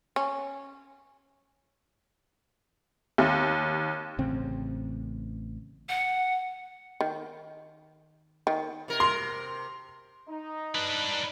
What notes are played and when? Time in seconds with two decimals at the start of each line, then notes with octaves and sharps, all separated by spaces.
0.16 C#4
3.18 D#2
4.19 A1 C#3 C4
5.89 F#5
7.01 D#3
8.47 D#3
8.88 C3 A#4
9.00 C6
10.29 D#4
10.75 D4 B4